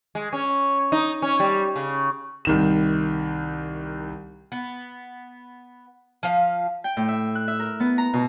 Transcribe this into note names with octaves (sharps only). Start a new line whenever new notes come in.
G#3
C#4
D#4
C#4
G3
C#3
C2 D#3 E7
B3
F3 F5
G5
A2
E5
F#6
E5
A#4
B3
A#5
B2